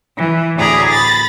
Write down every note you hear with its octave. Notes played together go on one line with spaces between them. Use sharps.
E3
D2 A2 G#4 D5 A#5 B5
B5 A6 A#6